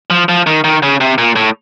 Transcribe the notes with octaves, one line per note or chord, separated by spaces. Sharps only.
F3
F3
D#3
D#3
C#3
C3
A#2
A2